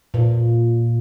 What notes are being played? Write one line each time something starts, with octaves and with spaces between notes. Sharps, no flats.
A#2